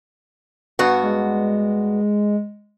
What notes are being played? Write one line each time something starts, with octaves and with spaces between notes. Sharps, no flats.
G2 B3 F#4
G#3